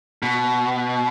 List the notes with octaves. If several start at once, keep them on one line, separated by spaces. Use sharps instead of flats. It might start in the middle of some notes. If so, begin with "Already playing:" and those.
B2